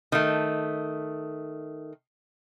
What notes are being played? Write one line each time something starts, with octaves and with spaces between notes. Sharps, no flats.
D#3 A3